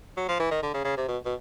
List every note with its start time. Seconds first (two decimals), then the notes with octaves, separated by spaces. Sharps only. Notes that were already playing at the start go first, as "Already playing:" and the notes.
0.17 F#3
0.29 F3
0.40 E3
0.52 D#3
0.63 D3
0.74 C#3
0.85 C#3
0.97 C3
1.09 B2
1.26 B2